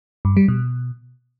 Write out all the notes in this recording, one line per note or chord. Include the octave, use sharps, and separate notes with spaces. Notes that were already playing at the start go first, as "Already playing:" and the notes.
G2
G3
B2